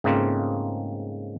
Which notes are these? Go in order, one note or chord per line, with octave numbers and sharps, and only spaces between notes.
G#2 C#3 A3 A#3 C4 F4